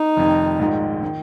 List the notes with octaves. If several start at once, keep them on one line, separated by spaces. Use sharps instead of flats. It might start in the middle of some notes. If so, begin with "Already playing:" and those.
Already playing: D#4
F1 F2 D#3
A#1 G#2 D#3
D#3